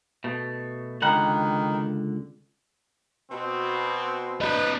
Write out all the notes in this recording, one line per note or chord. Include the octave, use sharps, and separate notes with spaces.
B2 A3
C#2 D3 D#3 F#5 G5 A#5 B5
B2 C4
D4 B4 D#5